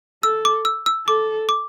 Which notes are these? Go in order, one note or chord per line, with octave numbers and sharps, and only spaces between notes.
A4 E6
D6
E6
E6
A4 D6
D6